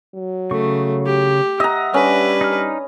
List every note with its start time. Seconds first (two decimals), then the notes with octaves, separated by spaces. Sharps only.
0.15 F#3
0.51 C#3 A3 C#6
1.06 G4
1.60 D#5 E5 F#5 A#5
1.94 G3 C#4 D4 B4
2.41 D#4 F6